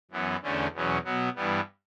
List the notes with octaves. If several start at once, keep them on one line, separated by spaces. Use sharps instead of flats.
F#2 E3 B3
E2 D3 A3 C#4
E2 B2 F#3 C#4
B2 F#3 B3
G2 E3 G3 B3